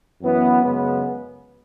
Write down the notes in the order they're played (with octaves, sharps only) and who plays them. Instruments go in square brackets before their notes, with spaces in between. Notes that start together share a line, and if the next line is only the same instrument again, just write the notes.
[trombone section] F#2 E3 B3
F#2 C#3 G#3 B3